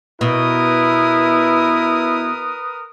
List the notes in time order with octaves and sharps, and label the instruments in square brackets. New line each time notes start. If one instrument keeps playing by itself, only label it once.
[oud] B2 [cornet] E4 [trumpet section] A#4 B4 D#6